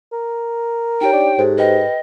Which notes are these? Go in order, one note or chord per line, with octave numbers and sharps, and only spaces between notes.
A#4
D#4 G4 C#5 G5
D4
G#2 G4 A4 C5
B4 D#5 G5